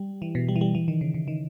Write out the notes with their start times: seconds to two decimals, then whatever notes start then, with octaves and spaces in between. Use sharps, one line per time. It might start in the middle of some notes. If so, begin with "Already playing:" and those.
Already playing: G3
0.22 E3
0.35 B2
0.48 G3
0.56 E3
0.61 G3
0.75 E3
0.88 D#3
1.01 C#3
1.14 C#3
1.28 D#3